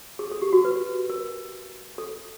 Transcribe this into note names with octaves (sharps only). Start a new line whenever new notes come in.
G#4
A4
G4
F#4
B4
A#4
A4